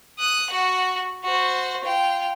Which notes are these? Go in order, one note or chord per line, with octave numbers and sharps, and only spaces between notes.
D#6 F#6
F#4 F#5
F#4 C5
F4 G5